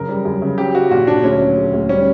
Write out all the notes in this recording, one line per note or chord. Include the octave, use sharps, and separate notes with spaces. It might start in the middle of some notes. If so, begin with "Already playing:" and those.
Already playing: F#2 C#3 A#4
G3
F#2
C#3
F#3 G4
F#3 F#4
A#2 F#4
A#2 D4
D2 C#4
F#3
D2
D2
G3 C#4